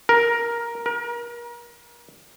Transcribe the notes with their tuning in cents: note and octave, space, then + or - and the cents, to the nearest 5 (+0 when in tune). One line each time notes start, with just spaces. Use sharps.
A#4 +10
A#4 +35